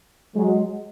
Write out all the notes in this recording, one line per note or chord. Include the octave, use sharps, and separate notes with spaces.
F#3 G#3